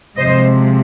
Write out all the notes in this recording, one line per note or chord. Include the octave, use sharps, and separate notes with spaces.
C3 F3 G#3 C5 D#5